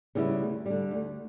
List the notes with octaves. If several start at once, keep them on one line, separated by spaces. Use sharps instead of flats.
C#3 G3 B3 E4
D2
D3 G3
D2